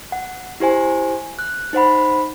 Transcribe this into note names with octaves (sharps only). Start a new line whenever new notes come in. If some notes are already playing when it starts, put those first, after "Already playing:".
F#5
E4 G4 C5 G#5
F#6
D#4 C5 F#5 B5